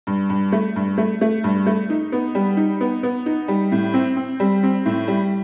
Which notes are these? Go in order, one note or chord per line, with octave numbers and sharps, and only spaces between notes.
G2
G2
A3
G2
A3
A3
G2
A3
D#4
B3
G3
D#4
B3
B3
D#4
G3
A2
C4
C4
G3
C4
A2
G3